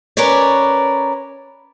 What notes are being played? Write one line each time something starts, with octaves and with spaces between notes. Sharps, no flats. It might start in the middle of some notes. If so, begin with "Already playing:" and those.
C#4 A#4 B4 C#5 D5